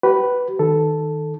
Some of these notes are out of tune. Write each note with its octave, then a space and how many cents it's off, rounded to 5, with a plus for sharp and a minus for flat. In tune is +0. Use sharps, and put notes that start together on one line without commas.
G4 -45 B4 +0
D#3 +0 A4 +0